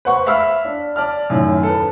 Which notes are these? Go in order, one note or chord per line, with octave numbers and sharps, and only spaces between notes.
B4 C5 F#5 C#6
E5 F5 B5 E6 F6 B6
D4
D5 A5 F6
F#2 A2 D#3
A4 B4